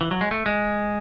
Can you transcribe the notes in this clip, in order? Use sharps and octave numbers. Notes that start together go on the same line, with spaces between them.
E3
F#3
G#3
A3
G#3